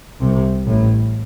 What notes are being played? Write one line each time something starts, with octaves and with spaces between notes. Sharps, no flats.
C2 C3
A1 A2